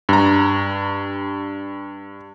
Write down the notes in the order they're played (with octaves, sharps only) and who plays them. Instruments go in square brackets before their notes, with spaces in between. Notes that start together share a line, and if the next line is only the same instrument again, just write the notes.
[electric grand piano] G2 A#5